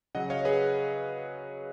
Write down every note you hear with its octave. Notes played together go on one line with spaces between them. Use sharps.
C#3 F#3 D#5 F#5
C#5 F5
G#4 B4